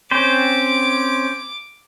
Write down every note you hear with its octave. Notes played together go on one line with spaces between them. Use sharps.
C4 C#4 C5 D6